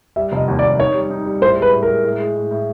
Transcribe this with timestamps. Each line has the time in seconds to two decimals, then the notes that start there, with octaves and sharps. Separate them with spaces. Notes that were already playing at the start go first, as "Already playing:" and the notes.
0.16 G3 E5
0.32 F1
0.37 D#5
0.48 D#2
0.59 D5
0.63 D#2
0.79 D#4 C#5
0.94 G3
1.10 D#4
1.26 G3
1.41 A2 C5
1.57 G#3
1.62 B4
1.73 A2
1.83 A#4
1.88 G#3
2.04 A2
2.20 G#3
2.36 A2
2.51 A2